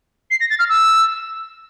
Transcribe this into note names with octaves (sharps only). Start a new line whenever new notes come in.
C7
A#6
A6
F6
E6